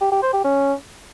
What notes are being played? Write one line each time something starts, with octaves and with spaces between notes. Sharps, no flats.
G4
G4
C5
G4
C#4